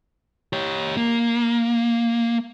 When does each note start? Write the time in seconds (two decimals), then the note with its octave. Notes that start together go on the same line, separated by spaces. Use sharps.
0.53 G4 C#5
0.97 A#3